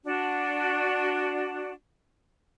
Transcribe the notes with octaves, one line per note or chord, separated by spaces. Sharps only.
D4 F#4